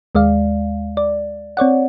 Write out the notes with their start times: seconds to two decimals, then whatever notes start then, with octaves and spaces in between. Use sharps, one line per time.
0.15 D#2 G#3 D5 F5
0.97 D5
1.57 C4 C#5 D5 F#5